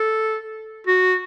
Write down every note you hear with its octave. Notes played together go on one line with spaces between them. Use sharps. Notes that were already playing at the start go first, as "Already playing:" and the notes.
Already playing: A4
F#4